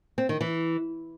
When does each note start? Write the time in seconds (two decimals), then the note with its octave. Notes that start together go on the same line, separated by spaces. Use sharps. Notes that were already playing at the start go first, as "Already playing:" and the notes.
0.18 C4
0.29 D#3
0.41 E3